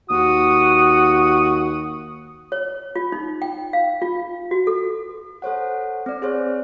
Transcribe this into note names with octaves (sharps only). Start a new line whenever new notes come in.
D#2 F#4 D#6
C#5
F4
D#4
G5
F5
F4
F#4
A4
A4 C5 C#5 F#5
C4 D5
G#4 C5 C#5